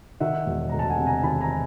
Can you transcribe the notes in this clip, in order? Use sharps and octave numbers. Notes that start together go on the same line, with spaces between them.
D#3 E5 F#5
E1
D2 A#5
A5
F#5 G#5
C3
G#5 A#5
D#3 A5 B5
G#5 A#5